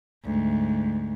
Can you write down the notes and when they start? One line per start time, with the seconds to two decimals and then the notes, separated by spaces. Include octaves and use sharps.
0.24 D2 G#2